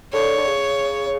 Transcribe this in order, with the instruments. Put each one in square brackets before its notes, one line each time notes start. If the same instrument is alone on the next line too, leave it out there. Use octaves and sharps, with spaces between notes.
[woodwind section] D3 [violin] C#5
[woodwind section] D3
C#3